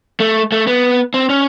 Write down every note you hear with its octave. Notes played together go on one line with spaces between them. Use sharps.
A3
A3
B3
C4
C#4